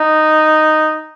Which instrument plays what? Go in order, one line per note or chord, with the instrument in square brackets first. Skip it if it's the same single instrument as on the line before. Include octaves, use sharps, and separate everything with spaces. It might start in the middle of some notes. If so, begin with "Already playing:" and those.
Already playing: [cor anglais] D#4